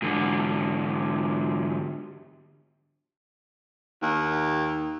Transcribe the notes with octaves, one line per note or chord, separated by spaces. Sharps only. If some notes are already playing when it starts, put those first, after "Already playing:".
G#2 D3
D#2